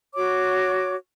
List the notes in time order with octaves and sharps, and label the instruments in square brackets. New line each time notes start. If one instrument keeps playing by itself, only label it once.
[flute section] F#4 C#5 D6